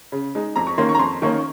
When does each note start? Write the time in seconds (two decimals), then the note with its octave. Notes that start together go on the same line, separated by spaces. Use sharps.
0.12 C#3
0.35 G#3 D#4
0.56 F2 A#5
0.67 C#6
0.78 D#3 A#3 C#4 C6
0.89 C#6
0.95 A#5
0.99 F2 C6
1.22 D#3 A#3 C#4 C#6